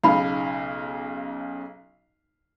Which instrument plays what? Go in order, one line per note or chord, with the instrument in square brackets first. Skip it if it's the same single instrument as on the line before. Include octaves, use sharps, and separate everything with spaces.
[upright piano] B1 C#3 F5 [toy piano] D#4 B5